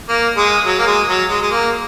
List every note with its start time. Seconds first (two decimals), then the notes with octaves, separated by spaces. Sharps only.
0.09 A#3
0.37 G#3
0.66 F#3
0.78 A#3
0.86 G#3
1.08 F#3
1.29 G#3
1.42 G#3
1.51 A#3